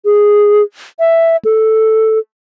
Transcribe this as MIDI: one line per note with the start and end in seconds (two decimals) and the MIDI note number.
0.05 0.62 68
0.99 1.37 76
1.45 2.19 69